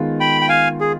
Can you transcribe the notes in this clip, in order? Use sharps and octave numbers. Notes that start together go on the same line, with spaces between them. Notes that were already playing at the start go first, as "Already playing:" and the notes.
Already playing: D#3 G#3 B3 F4
G5 B5
G5
F5 G#5
G#4